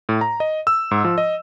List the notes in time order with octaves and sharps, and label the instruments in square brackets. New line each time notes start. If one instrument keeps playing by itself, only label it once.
[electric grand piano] A2
A#5
D#5
E6
G#2
F3
D#5